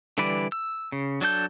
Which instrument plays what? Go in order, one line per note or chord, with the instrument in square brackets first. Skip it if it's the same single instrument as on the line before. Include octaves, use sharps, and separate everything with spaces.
[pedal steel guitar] D3 E3 G3 B4 D5
E6
C#3
F#3 D4 A4 G6